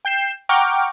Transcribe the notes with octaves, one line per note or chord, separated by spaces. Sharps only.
G5 G6 C7 E7
F#5 G5 A#5 C#6 D6 F6